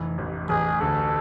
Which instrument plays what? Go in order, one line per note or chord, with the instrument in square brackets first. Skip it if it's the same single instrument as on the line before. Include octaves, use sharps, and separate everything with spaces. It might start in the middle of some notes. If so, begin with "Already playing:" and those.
Already playing: [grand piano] F1 E3
A1
[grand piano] A1 [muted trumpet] G#4
[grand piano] D2 [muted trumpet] A4